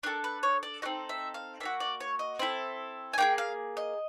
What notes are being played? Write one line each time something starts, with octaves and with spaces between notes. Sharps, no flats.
D4 F#4 A4 A#4
B4
C#5
D5
C4 D#4 F#4 A4 D#5
E5
F5
A#3 D4 F#4 E5
D5
C#5
D#5
C4 E4 A4
G#5
A#3 D#4 G#4 G5
F5
D#5